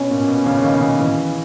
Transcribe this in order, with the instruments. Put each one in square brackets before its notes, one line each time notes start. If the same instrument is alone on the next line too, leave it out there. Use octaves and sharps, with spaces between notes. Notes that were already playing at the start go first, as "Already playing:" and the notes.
Already playing: [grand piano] B2 [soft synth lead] C#4
[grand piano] A#2
B2
A#2 C#3
C#3
B2 D#3
B2 D#3
C#3 E3